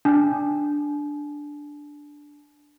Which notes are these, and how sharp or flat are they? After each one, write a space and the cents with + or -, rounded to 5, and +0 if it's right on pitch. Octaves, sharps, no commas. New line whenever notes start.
D4 +0 G#5 +45